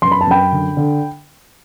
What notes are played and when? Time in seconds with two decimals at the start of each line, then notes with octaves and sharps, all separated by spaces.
0.02 F#2 C6
0.12 B5
0.21 A5
0.27 F#2 G5 B5
0.52 D3
0.77 D3